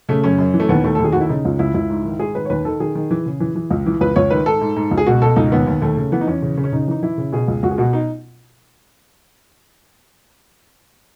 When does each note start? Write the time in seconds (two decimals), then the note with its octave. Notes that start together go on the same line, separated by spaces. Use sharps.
0.09 C#3 A3
0.24 F#2 C#4
0.38 F#2
0.54 E3
0.60 A3
0.69 D#2 B3
0.84 D#2 A3
0.95 A4
0.99 D#2 G#4
1.12 D#2 F#4
1.21 E4
1.29 C#3 D#4
1.45 C#2
1.59 C#2 E4
1.74 C#2 E4
1.89 G#2
2.04 D#3
2.20 G#2 G#4
2.35 D#3 B4
2.45 C#5
2.50 D#2 B4
2.65 D#3 A4
2.80 D#3 G#4
2.95 D#3
3.11 E3
3.26 C#3
3.40 E3
3.56 E3
3.70 C#2
3.86 E3
4.01 C#2 B4
4.16 C#2 C#5
4.31 D#3 B4
4.46 G#2 A4
4.61 G#2
4.76 G#2
4.91 C#2
4.98 G#4
5.07 B2 F#4
5.22 B2 A4
5.36 C#2 D#4
5.52 D#2 B3
5.67 D#2
5.82 D#2 A3
5.97 C#3
6.12 E3 B3
6.21 D#4
6.27 E2 C#4
6.42 C#3
6.57 C#3
6.64 C#4
6.72 C#3 D#4
6.88 E3 D#4
7.03 E3 E4
7.18 C#3
7.32 B2 G#4
7.48 C#2
7.63 C#2 F#4
7.71 G#4
7.78 B2 F#4
7.93 D#4